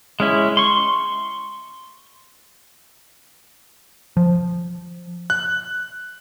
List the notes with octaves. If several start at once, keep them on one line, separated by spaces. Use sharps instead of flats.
G#3 C#4 E4
C6 C#6
F3
F#6